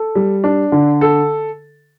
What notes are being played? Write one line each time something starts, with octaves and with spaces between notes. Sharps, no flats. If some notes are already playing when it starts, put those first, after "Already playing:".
Already playing: A4
G3
D4
D3
A4